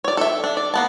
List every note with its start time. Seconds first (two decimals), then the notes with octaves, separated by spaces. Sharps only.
0.04 C#5 D5
0.17 A4 E5
0.44 D4
0.57 D5
0.74 A#3 B3 A5